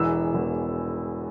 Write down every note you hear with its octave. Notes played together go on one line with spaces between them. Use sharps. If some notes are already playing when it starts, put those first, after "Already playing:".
Already playing: E1 E2 E3 E6
E1 E2 E3